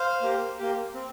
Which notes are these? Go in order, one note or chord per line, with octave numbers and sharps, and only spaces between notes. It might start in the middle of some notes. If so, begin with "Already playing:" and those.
Already playing: C5 F5
A#3 G4
A#3 G4
C4